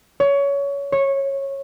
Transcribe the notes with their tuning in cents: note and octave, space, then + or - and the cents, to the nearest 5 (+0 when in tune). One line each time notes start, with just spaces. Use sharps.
C#5 +20
C#5 -15